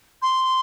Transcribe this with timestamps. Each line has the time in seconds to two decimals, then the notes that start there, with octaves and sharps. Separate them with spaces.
0.22 C6